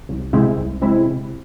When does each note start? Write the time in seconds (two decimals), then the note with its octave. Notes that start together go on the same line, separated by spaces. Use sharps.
0.09 C2
0.33 C3 G#3 C4 E4
0.57 C2
0.82 C3 G#3 C4 E4
1.06 C3